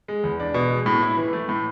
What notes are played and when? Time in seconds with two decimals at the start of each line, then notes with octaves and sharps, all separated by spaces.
0.08 G#3
0.23 E2
0.40 D4
0.54 B2
0.70 G#3
0.86 A2
1.02 E4
1.17 E3
1.33 A3
1.49 A2